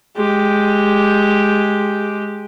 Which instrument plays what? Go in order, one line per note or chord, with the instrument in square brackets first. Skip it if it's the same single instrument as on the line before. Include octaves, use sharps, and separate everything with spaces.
[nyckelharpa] G#3 G4